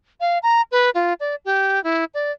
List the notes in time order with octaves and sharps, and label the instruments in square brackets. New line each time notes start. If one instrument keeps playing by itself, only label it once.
[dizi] F5
A#5
B4
F4
D5
G4
E4
D5